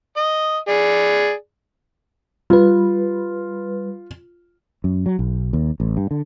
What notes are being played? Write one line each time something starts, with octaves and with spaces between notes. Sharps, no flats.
D#5
G#4 D5
G3 F4 B4
F#2
F#3
B1
D#2
A1
G2
D3